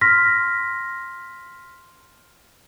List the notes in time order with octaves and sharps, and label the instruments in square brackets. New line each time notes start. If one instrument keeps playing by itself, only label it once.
[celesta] C6 F6 A#6 B6